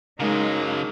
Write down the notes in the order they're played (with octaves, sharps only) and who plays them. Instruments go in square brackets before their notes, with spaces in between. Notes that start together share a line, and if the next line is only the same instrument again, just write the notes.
[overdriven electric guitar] C#3 F#3 [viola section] G#3 [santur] A#3 [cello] D#4